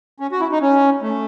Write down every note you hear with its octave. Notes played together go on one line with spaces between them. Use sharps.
C#4
F#4
E4
D#4
C#4
A3